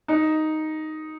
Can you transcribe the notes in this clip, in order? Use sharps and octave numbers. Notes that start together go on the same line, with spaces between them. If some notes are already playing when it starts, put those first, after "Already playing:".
D#4